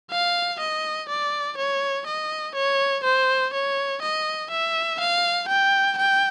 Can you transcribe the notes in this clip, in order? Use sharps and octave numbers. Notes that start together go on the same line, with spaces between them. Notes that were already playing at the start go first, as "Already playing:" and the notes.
F5
D#5
D5
C#5
D#5
C#5
C5
C#5
D#5
E5
F5
G5
G5